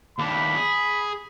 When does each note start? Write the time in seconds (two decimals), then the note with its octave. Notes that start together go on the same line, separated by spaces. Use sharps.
0.19 D#2 D4 B5
0.56 G#4